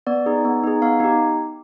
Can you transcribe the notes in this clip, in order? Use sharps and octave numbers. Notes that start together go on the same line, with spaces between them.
B3 D5
D#4 G#4
B3
D#4 G#4
B3 F5
D#4 G4